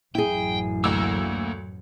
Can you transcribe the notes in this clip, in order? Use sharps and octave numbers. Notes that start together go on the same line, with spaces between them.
A1 F#2 E4 G#4 G5
D2 A#3 E6